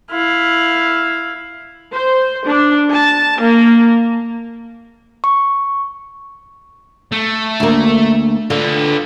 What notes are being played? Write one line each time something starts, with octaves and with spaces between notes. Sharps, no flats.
E4 F5
C5
D4
A5
A#3
C#6
A3
D2 A#3
D3 F4 B4